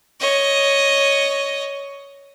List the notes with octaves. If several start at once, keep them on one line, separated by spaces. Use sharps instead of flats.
C#5 D#5